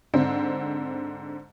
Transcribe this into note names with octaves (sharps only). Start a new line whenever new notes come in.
G#2 D3 C4